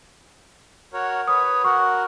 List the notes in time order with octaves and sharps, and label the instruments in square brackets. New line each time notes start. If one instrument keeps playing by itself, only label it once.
[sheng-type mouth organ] F#4 A#4 C#5
[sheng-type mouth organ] B4 C#5 [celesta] D#6
[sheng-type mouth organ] F#4 A#4 [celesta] C#6